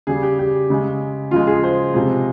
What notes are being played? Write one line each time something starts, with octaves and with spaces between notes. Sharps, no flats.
C#3 G3 G#4
G4
G4
C#3 G#3
C#3 F3 G#3 F4
G#4
C5
C3 F3 G#3